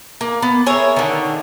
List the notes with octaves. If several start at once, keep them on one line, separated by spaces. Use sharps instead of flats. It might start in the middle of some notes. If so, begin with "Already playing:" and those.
A#3
B3
G#4 A#4 C#5 E5
D3 D#3